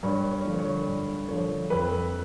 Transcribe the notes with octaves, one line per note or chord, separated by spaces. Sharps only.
G2 C#5
C#5
D3 F3
C#5
G2
D3 F3 C#5
F2 B4